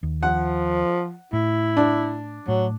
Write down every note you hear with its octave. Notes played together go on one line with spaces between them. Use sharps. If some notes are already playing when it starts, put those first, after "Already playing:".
D#2
F3 F#5
A2 E4
D4
A2 F#3